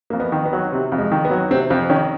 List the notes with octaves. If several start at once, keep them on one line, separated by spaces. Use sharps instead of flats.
F2 A#3
B3
D#3
B3
F#3
C3
F2
G#3
D#3
B3
F#3
C3 C4
F2 C4
D#3 C#4